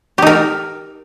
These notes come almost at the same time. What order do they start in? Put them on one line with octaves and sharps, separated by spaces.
G4 D#4 A#4